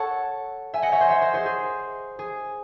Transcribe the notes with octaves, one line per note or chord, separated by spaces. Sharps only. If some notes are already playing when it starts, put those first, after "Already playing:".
Already playing: A4 C#5 F#5 A5
E5 G#5
D#5 F#5
C#5 E5
C5 D#5
C#5 E5
C5 D#5
G#4 C5
G#4
G#4